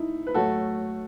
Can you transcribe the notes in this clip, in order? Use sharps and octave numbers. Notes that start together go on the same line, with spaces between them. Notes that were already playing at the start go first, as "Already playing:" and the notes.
Already playing: D#4 E4
B4
A2 F#3 A3 F#4 A4